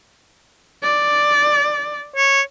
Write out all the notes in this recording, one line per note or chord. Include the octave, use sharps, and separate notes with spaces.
D5
C#5